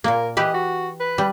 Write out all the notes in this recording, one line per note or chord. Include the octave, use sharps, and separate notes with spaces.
A#2 A#3 A#4
E3 G4 B4 D#5
F#4
B4
G3